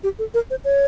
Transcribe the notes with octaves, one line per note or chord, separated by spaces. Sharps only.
G4
A4
A#4
C5
C#5